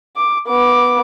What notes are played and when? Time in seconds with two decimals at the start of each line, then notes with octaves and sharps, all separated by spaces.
0.16 D6
0.47 B3 D6